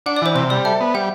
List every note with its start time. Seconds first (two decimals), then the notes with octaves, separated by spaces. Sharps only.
0.06 D4 F#5
0.16 D5
0.22 E3 C5
0.35 C3 C5
0.50 G3 D5
0.65 A4 E5
0.81 B3
0.94 G3 F#5